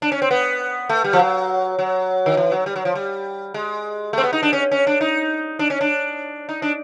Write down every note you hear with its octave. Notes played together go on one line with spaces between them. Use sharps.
D4
C#4
C4
B3
A3
G3
F3
F#3
F#3
D#3
E3
F#3
G3
F#3
F3
G3
G#3
A3 C4
B3
D#4
D4
C#4
C#4
D4
D#4
D4
C#4
D4
D#4
D4